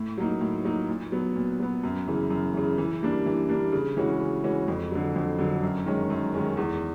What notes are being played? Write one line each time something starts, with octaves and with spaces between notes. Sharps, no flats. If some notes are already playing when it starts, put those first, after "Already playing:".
Already playing: A2
F#3 A#3 D#4
A2
F#3 A#3 D#4
A#2
F#3 B3
A#2
F#3 B3
F#2
C#3 E3
F#2
C#3 E3
E3
G3 A#3 D4
E3
G3 A#3 D4
C#3
E3 G#3 C#4 F#4
C#3
E3 G#3 C#4 F#4
F2
D3 F#3
F2
D3 F#3
F#2
D#3 G#3 C#4
F#2
D#3 G#3 C#4
E2